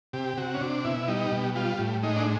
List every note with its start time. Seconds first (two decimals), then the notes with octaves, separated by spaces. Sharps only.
0.13 C3 G4
0.37 C3 F#4
0.54 C#4
0.61 C3 D4
0.85 B2 E4
1.08 G3 D#4
1.32 B2
1.55 G3 F4
1.79 A2
2.03 G#3 D#4
2.16 D4